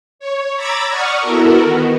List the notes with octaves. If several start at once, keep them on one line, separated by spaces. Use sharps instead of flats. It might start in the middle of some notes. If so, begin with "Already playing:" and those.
C#5
A#5 B5 D6 E6 G#6 A6
D5 F#5 C#6 D#6 F6
B3 E4 F#4 A4 A#4
D#3 B3